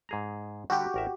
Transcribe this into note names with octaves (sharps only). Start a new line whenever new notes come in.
G#2 G#4 A#5
D3 G3 F#4 G4
A1 A#4 E5